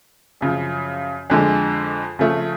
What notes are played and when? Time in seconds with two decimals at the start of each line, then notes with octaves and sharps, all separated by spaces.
0.41 F#2 C#3 F3
1.30 F2 D3 G#3
2.19 C#3 F3 A3